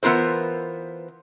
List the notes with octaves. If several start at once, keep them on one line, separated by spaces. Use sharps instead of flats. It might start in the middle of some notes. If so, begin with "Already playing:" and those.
E3 B3 F4 A#4 C5